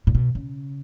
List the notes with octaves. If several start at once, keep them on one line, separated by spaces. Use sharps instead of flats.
A#2
B2
C#3